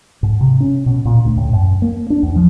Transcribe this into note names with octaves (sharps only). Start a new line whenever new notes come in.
G#2
C3
C#4
B2
A#2
D2
A2
F#2
A#3
D4
E2
F3